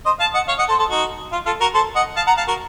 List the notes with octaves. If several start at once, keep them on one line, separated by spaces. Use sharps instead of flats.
C5 D#5
F5 A5
D#5 F#5
C#5 F5
D#5 F#5
A4 C5
A4 C5
D#4 F#4
F4
F4 A4
F#4 A#4
A4 C5
D#5 F#5
F5 A5
F#5 A#5
F5 A5
F#4 A#4